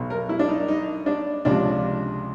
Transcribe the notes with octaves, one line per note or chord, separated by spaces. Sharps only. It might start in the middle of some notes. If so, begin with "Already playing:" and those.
Already playing: B1 B2
A#4
E4
D4
D#4
D#4
D4
C#2 C3 F3 D4